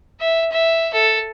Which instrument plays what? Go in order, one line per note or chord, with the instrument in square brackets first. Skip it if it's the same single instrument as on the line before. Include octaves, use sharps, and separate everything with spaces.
[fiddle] E5
E5
A4